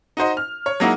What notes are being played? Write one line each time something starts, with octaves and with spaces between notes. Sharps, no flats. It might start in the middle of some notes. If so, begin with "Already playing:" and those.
D#4 F#4 C5 D#5
F6
C#5
F#3 G#3 A#3 D#4 E4 F#4